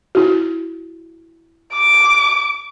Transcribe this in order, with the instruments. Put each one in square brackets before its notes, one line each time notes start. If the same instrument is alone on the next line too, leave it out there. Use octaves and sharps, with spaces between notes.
[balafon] E4 F#4
[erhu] D6